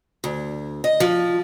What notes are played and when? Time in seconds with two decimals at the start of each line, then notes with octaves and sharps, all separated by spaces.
0.24 D2
0.84 D#5
1.00 F3